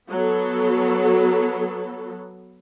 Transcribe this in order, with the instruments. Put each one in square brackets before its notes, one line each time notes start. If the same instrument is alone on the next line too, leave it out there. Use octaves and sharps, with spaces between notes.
[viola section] F#3 B3 A4